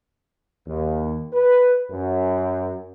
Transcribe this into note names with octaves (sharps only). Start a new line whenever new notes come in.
D#2
B4
F#2